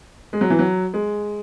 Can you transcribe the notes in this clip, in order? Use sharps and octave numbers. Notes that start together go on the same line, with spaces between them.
G#3
F#3
E3
F#3
G#3